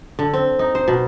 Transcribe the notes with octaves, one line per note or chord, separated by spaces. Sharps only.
D3
C4
D#4
C5
B2